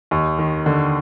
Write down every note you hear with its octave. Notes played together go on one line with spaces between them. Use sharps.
D#2
D#3
D3